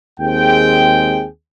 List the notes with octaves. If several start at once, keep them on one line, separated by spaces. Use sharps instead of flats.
D#2 G#3 C4 G#4 G5